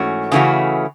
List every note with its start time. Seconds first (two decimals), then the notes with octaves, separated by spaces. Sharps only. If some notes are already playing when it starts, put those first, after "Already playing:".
Already playing: G#2 E3 A3 C#4 F#4
0.32 C#3 E3 A3 C#4 F#4